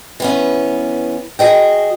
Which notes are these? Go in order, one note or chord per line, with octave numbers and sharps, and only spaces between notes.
E3 B3 C#4
F#4 G#4 D#5 G5